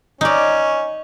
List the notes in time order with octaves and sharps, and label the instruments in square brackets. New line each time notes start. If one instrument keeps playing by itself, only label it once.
[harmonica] C#4 [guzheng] D#4 D5